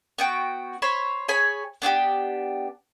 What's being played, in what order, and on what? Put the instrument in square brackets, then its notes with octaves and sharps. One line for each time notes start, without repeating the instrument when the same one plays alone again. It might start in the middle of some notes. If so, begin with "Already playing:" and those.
[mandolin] B3 F#4 G5
C5 C#5 B5
G#4 C#5 G#5 B5
B3 D4 F#4 G4